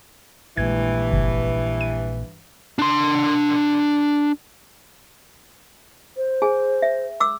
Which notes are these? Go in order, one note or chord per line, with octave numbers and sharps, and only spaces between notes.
A#1 G2 A#2 E3 G#3 G#6
G1
D#7
D4 C6
C5
G#4 G#5
E5
D6 E6